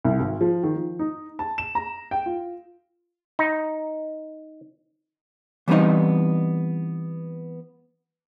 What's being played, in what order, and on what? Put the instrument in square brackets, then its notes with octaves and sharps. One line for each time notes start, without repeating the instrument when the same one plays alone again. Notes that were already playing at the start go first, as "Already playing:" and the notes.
[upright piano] C2
G#1
F3
D#3
F3
D#4
A5
E7
A#5
G5
F4
[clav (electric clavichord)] D#4
[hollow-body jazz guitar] E3 G3 B3 C4 D#4 D#5